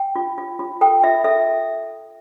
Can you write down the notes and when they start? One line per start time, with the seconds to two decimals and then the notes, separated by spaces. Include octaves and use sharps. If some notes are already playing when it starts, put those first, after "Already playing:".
Already playing: G5
0.16 F4
0.38 F4
0.59 F4
0.81 A4 G5
1.03 F4 E5
1.24 A4 E5